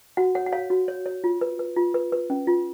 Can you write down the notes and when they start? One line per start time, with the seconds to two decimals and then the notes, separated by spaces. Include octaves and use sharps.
0.17 F#4 F#5
0.35 C#5 F#5
0.46 F#5
0.52 C#5 F5
0.70 F#4
0.88 C#5
1.06 C#5
1.24 F4
1.41 B4
1.59 B4
1.77 F4
1.94 B4
2.12 B4
2.30 C#4
2.47 F4